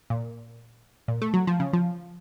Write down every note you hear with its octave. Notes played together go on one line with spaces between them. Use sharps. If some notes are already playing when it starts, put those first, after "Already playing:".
A#2
A#2
A3
F#3
F3
C#3
F3